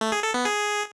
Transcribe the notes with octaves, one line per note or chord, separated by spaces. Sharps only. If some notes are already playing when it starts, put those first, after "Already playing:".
A3
G#4
A4
B3
G#4